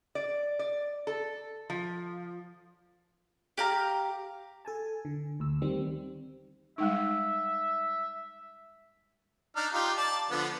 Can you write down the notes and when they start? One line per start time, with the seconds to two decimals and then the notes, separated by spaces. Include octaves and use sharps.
0.15 D5
0.59 D5
1.07 A4
1.70 F3
3.57 G4 F5 A#5
4.65 A4 G#5 A5
5.05 D3
5.40 D2 E6
5.62 D#3 G3 C4
6.78 G3 G#3 D#4 E5
9.56 D4 D#4 F6
9.73 D#4 F4 G4
9.97 D5 A5
10.31 D3 F3 B3